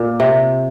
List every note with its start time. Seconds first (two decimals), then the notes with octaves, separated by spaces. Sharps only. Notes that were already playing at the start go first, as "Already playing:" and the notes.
Already playing: A#2
0.20 C3